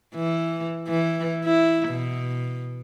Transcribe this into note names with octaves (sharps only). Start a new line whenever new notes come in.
E3
E3
E4
B2